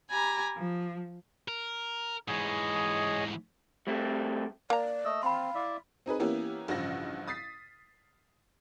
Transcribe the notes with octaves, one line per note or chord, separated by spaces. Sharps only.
G4 G#5 A#5 B5
F3
A#4
G#2 E3 G#4 C#5 D#5
G3 A3 C4
A#3 D5 A#5
A3 D#5 E6
C4 F5 B5 C6
E4 D5 E5
C4 D#4 G#4 B4
E3 A#3 B3 C#4 E4 G4
A1 G2 C#3 F3 F#5 A#6
D#6 A6 B6 C7